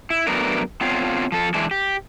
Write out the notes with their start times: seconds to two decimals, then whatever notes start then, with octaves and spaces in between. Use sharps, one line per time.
0.10 E4
0.27 F#3 A3 B3 D4 A#4
0.81 B3 C4 D4 F4 C#5 F5
1.32 F3 A4
1.54 E3 G#3 D4
1.71 G4